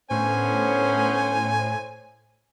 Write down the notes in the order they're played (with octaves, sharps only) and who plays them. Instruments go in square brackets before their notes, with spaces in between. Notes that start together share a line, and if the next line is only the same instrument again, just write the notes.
[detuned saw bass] A2 [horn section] D3 B3 C#4 [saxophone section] C5 C#5 [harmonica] G#5